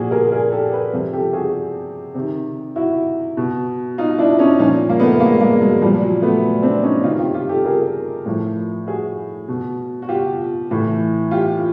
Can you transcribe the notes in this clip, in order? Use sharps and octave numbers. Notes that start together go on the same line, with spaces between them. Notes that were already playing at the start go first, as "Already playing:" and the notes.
Already playing: A#2 F3 F#4 G#4
G#4 A#4
G#4 A#4
G4 A4
A4 B4
C3 F3
G4 A4
F#4 G#4
C3 D#3
E4 F#4
B2
D#4 F4
D4 E4
C#4 D#4
A#2 F3 C#4 D#4
A#3
A3 B3
G#3 A#3
G#3 A#3
F#3 G#3
A#2 F3 G3
F#3
A3 B3
C4 D4
C#4 D#4
C3 D#3 D#4 F4
F4 G4
F4 G4
G4 A4
G#4 A#4
A2 F3
F#4 G#4
B2
F#4
F4 G4
A2 E3
F4 G4